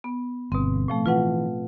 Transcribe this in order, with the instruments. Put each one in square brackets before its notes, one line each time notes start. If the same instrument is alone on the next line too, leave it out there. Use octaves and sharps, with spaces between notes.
[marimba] B3
[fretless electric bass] G1 [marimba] B2 C4
[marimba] A2 F3 A3
[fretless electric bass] E3 [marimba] F4 B4 F#5